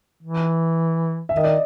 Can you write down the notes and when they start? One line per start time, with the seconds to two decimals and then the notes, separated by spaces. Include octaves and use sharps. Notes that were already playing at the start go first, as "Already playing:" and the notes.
0.23 E3
1.29 D#3 E5
1.37 D#5
1.44 D5